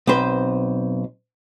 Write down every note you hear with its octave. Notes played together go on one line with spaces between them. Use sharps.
B1 C4 B4 C5